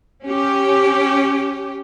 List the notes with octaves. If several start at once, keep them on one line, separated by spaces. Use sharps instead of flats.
C#4 G4